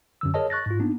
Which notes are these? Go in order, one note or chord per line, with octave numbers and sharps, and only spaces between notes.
F#2 D3 E6
G#4 A#4 C#5 D#5 A5
C#6 F#6 A6 A#6
G#2 F4
A#3 B3 D4 D#4